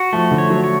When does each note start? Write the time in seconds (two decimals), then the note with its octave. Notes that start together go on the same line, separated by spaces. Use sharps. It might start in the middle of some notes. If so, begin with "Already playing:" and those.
Already playing: F#4
0.13 F3 A3
0.31 D3
0.38 C#5
0.50 F#3
0.64 C#5